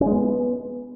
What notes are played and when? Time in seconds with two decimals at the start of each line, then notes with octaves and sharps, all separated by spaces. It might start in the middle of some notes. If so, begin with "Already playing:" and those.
0.01 C#4
0.06 G#3
0.12 B3